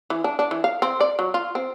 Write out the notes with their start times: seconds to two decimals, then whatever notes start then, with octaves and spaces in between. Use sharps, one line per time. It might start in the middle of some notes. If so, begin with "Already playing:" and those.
0.10 E3
0.24 D4
0.39 D4
0.51 E3
0.64 F5
0.82 C4
1.00 D5
1.19 F#3
1.34 F4
1.55 C4